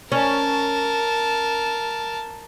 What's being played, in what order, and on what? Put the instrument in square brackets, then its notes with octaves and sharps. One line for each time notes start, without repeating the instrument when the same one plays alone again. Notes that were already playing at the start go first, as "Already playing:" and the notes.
[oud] C#4 [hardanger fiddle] A#4 A5